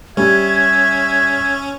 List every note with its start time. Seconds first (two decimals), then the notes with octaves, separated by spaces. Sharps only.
0.17 G3 C#4 E5 G#6